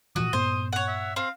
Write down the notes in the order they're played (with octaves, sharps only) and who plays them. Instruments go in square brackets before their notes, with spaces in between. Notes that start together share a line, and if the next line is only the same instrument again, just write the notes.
[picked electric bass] A#2 E3 F3 [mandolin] F#4 [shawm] D#6
[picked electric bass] G2 A#2 B3 [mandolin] C5
[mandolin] C#5 F#5
[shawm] E5
[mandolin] C4 [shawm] F5